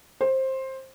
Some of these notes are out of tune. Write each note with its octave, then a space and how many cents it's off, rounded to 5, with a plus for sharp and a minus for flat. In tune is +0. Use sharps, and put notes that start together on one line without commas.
C5 +15